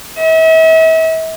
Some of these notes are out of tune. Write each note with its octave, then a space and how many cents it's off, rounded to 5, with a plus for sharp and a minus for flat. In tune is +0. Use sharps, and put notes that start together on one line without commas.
E5 -40